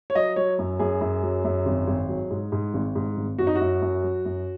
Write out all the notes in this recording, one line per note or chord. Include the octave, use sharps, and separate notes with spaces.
C#5
F#3 D#5
F#3 C#5
F#2
F#2 G#4
F#2
F#3
F#2
G#1
G#1
F#3
G#2
G#2
G#1
G#2
G#1
F#2 F#4
D#4
F#4
F#2
F#2
F#3
F#2